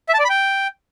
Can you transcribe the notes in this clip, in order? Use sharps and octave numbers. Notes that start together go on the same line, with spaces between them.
E5
A5
D5
B5
G5